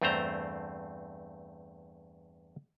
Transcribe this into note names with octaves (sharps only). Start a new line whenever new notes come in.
E2 G2 A3 C4 C5 A#5